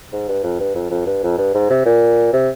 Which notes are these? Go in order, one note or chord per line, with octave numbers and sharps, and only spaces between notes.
G#2
G2
F2
G2
F2
F2
G2
F2
G2
G#2
C3
A#2
C3